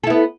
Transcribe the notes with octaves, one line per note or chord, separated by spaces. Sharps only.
B3 E4 A4